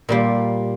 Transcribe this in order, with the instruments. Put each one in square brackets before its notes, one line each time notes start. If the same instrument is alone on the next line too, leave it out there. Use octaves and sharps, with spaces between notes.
[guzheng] A#2 G3 A#3